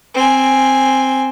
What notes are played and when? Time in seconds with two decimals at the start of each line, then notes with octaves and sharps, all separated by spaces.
0.14 C4 G#5